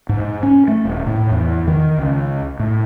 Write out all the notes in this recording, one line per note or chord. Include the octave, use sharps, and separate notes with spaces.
G#2
C#4
A3
D#1
A2
E2
D#3
C#2
A2